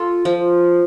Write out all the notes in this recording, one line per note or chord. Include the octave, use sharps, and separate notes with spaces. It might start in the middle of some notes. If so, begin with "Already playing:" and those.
Already playing: F4 A4
F3